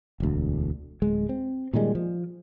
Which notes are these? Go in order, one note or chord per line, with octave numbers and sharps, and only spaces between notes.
E1 D2
D1 G#3
C4
A#2 D#3 G3 G#3
F3